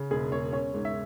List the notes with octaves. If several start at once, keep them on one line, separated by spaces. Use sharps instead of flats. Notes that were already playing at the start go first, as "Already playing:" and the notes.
Already playing: C#3
E1 G#4
E1 C#5
C#4 C#5
G#2
E5